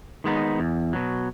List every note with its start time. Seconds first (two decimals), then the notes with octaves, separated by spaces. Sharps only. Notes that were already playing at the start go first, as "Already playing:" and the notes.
0.24 D#3 G#3 B3 D#4
0.59 E2
0.93 B2 F#3